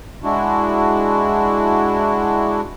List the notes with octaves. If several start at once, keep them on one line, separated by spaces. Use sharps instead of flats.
G#3 D4 E4 F#4